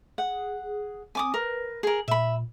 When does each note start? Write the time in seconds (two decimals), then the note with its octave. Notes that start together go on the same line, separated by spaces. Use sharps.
0.18 G#4 F#5
1.15 C4 G#5 D6 D#6
1.34 A#4 B4
1.83 G#4 A#4
2.08 A#2 E5 B5